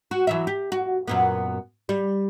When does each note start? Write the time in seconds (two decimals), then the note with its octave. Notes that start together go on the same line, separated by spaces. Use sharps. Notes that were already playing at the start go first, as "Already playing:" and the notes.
0.11 F#4
0.27 E3 F#3 E5
0.47 G4
0.72 F#4
1.07 F#2 A#2 B3
1.89 G3